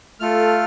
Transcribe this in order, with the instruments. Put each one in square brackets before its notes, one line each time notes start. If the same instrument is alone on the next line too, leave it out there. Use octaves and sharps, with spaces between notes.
[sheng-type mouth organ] A3 F4 A4 F6